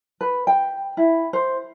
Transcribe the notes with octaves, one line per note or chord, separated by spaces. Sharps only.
B4
G5
E4
C5